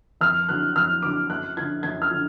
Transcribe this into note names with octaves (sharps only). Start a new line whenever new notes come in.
F2 F6
D3 F#3 F#6
F2 F6
D3 F#3 D6
F#2 F#6
D3 F3 G#6
F#2 G#6
F6
D3 F3